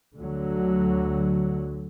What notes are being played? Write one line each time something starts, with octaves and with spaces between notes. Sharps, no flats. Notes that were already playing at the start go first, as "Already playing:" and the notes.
D2 D3 F#3